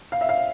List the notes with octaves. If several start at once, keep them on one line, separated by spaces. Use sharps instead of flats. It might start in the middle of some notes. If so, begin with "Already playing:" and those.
F5
E5
F5